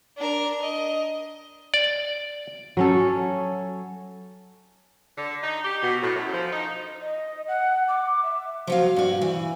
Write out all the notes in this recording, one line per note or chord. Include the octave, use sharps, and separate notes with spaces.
D4 A#4
D#5
D5
F#3 C#4 A4
D3
D#4
G4
B2
A2
F#2
F3
D#4
D#5
F#5
D6
E5
F3 F#3 F5
G2 F#4
E3